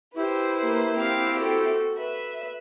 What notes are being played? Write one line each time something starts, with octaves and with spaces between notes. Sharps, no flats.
E4 G4 B4 C5
A#3 G4
C4 G4 F5
F#4 A4
B4 E5